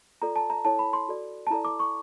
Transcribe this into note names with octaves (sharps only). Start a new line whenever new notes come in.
F4 A4 D5 A#5
A5
A#5
E4 A4 C#5 A5
B5
C6
F#4 A4 D5
A5
E4 A4 D5 A#5
D6
C#6